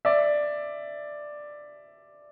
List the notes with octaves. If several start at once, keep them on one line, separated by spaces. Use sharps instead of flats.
D5 E5